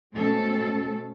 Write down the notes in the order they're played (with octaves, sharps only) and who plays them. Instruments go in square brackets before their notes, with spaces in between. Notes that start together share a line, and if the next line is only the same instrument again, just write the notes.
[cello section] B2 G#3 A3 C4 C#4 A4